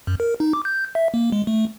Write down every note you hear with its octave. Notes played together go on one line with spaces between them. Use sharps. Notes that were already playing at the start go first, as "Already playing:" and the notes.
F#2
A#4
D#4
D6
G6
E5
A#3
G#3
A3